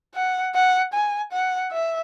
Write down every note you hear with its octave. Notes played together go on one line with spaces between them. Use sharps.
F#5
F#5
G#5
F#5
E5